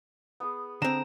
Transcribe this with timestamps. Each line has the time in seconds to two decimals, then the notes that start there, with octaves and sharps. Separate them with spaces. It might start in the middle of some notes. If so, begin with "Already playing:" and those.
0.40 B3 G#4
0.82 D3 C4 A#5 E7